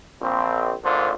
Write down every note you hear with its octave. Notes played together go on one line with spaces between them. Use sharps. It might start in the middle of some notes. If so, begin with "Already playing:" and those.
A#1 C4
G#1 A#2 D3 C5